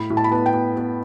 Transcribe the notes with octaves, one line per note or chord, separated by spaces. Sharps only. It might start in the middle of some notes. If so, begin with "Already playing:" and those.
Already playing: A2 B5
A2
A5
B5
B3 A5
G5
B3
B3